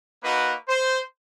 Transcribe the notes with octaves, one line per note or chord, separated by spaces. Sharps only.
A#3 D#4 F#4 B4
C5